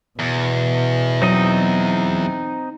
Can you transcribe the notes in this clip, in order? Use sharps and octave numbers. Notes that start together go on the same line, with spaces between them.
E2 B2
F#3 C4 D#4 D#5